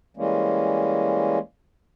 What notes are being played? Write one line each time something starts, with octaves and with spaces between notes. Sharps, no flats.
E3 G3 G#3 A#3 C#4